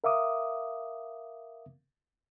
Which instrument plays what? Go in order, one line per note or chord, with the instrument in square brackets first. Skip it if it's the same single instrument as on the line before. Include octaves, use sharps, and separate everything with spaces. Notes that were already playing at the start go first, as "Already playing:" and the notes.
[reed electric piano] A#4 E5 F5 D6 D#6